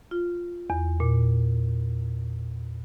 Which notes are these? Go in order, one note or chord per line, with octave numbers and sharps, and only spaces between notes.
F4
E2
A#2